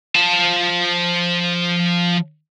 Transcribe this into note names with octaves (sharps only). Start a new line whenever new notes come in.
F3 A5